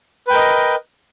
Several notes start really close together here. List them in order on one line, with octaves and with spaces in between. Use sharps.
B4 G5 A#4 D#5